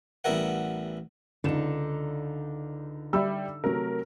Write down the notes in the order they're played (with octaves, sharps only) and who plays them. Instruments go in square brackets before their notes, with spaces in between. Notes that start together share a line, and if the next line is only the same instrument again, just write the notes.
[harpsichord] A1 G3 B3 E4 A#4 F#5
[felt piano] C#2 E7 [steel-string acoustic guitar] D3 D#4
[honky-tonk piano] G3 [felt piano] E5 B5 E6
[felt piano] C3 F#3 A3 [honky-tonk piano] A#4